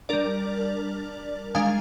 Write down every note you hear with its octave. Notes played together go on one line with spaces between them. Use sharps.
G3 D4 A#4 D5
D#3 G#3 D4 F5 G#5